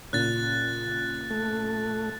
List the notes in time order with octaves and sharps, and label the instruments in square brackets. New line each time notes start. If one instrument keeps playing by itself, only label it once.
[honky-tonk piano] A#2 C#3 [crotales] F#6 A6
[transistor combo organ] A3